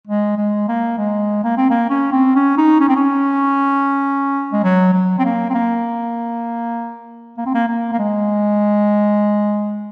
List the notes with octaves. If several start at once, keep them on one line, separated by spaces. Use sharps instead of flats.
G#3
G#3
A#3
G#3
A#3
C4
A#3
C#4
C4
C#4
D#4
C#4
C4
C#4
G#3
F#3
F#3
C4
A#3
C4
A#3
A#3
C4
A#3
A#3
A#3
G#3